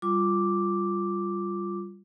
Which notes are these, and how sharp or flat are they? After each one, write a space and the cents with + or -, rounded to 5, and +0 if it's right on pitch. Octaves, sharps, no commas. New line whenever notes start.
G3 +0 F4 +0 D6 +0